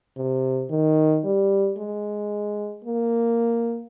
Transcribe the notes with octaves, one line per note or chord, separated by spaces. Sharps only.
C3
D#3
G3
G#3
A#3